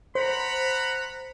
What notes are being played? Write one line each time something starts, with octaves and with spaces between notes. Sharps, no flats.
C5 F#5 A#5 B5